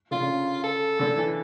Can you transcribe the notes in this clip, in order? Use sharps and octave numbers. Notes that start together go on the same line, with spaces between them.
D3 F4
C#3
A4
D3
E3